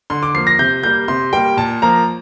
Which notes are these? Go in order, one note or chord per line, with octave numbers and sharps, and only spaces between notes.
D3 C6
D6
F3 A#3 C7
A#6
C3 G6
G3 A#3 G6
C3 C6
G3 A#3 G5
A#2 A5
F3 A#3 A#5